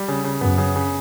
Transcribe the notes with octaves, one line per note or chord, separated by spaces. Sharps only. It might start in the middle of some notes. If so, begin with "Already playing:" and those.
Already playing: G3
C#3
C#3
F#2 B3
C#3
C#3